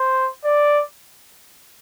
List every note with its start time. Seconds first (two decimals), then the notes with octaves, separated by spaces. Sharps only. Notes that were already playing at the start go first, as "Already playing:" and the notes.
Already playing: C5
0.45 D5